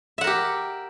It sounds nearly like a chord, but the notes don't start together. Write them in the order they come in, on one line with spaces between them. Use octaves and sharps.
E5 F#5 A#4 G4